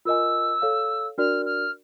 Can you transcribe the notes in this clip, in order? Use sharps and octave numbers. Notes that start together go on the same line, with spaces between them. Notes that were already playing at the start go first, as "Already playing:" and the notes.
F4 A#4 D#5 G#5 E6
A4 C#5 F5
D4 F#4 A#4 D5 F6
F6